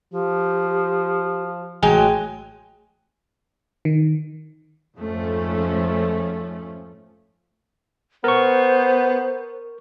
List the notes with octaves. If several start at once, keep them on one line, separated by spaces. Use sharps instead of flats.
F3 G4
A1 F#3 G#3 G5 G#5
D#3
F2 G#2 F3 A3 C#4
B3 A#4 C5 C#6